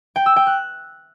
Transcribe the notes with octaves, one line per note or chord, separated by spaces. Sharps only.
G5
E6
G5
F#6